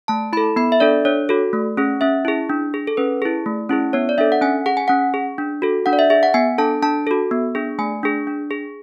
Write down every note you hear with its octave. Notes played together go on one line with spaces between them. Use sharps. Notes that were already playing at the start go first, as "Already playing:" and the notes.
A3 A5
E4 A4 B5
B3 B5
E5
D4 A4 D5
D4 C#5
F#4 A4
A3
C#4 G#4
C#4 E5
E4 G#4
D4
G#4
A4
C#4 B4
E4 G#4
A3
C#4 E4 G#4
B3 C#5
D5
D4 A4 E5
F#5
C#4 G#5
G#4 F#5
G#5
C#4 F#5
G#4
D4
F#4 A4
D4 F#5
D5
E5
G#4 E5
F#5
B3 G#5
D4 A4 A5
D4 A5
F#4 A4
B3
D4 G#4
A3 G#5
D4 G#4
D4
G#4